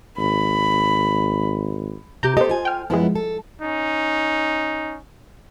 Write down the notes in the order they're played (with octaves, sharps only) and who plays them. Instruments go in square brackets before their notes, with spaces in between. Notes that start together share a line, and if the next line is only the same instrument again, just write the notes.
[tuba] G#1 [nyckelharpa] B5
[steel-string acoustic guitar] C3 G4 [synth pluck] A#5 G6
[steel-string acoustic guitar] B3 G4 A4 [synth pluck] C5 D#5
[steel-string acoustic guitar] F4 G#5
[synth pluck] G5 F6
[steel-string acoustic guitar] F#2 B3 E4 [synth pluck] F3 G#3
[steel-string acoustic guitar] A4
[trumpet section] C#4 D#4